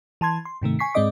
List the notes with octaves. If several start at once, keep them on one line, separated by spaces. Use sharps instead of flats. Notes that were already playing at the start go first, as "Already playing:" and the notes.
E3 A5 C6 G#6
C6
G#2 C3 D#3 A3
G#5 C#6 B6 C7
G#2 G#3 C4 D5 D#5 D6